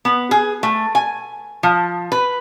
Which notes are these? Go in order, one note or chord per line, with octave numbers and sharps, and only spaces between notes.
B3
G#4
A3
G#5
F3
B4